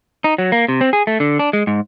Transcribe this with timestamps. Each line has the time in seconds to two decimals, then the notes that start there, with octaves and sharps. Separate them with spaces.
0.24 D#4
0.38 F#3
0.52 A#3
0.68 C3
0.81 C4
0.93 G#4
1.07 A3
1.20 D3
1.39 D4
1.53 G#3
1.67 G#2